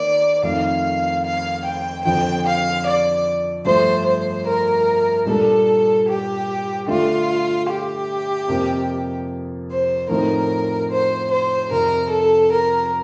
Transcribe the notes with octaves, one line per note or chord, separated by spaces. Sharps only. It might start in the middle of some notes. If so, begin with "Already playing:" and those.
Already playing: D#3 A#3 D5
F2 D#3 A3 F5
F5
G5
F2 D3 F3 G5
F5
D5
G2 F3 A3 C5
C5
A#4
A#2 G3 D4 A4
G4
D3 A3 D4 F4
G4
F2 C3 F3 A#3
C5
A2 F3 C4 D#4 A#4
C5
C5
F2 C3 F3 A#4
A4
A#4